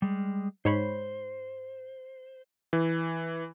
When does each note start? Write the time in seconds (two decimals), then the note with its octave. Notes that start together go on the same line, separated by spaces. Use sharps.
0.02 G3 G#3
0.65 G#2 C5 C#5 B5
2.73 E3